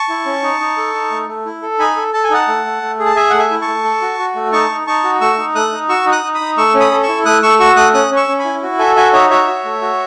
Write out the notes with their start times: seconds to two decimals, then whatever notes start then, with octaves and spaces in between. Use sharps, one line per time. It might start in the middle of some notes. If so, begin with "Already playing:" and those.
Already playing: A5 C#6
0.09 E4
0.26 C#4
0.43 D#4
0.60 D#4
0.77 A4
0.94 D#4
1.11 A3
1.28 A3
1.46 E4
1.62 A4
1.79 D#4 G#5 B5
1.96 A4
2.13 A4 A5
2.23 G#5
2.31 D#4 F#5 A5
2.48 A3
2.65 A3
2.82 A3
2.99 G#4
3.06 A5
3.16 G#4 E5 G#5
3.30 A3 F#5
3.39 E5 G#5
3.51 E4
3.62 A5 C#6
3.67 A3
3.84 A4
4.01 F#4
4.19 F#4
4.36 A3
4.52 D#4 A5 C#6
4.70 D#4
4.87 D#4 A5 C#6
5.04 F#4
5.21 A3 C#6 E6
5.38 D#4
5.55 A3 D#6 F#6
5.72 D#4
5.89 F#4 C#6 E6
6.06 D#4
6.12 D#6 F#6
6.23 D#4
6.34 B5 D#6
6.40 D#4
6.57 A3 C#6 E6
6.74 C#4
6.80 B5 D#6
6.91 A4
7.03 C#6 E6
7.09 E4
7.25 A3 D#6 F#6
7.43 A3 C#6 E6
7.60 F#4 C#6 E6
7.76 A3 D#6 F#6
7.94 C#4 D#6 F#6
8.11 C#4
8.16 C#6 E6
8.28 C#4
8.39 G#5 B5
8.45 E4
8.63 F#4
8.79 A4 E5 G#5
8.96 F#4 E5 G#5
9.13 D#4 C#5 E5
9.30 F#4 C#5 E5
9.48 F#4
9.65 A3
9.82 F#4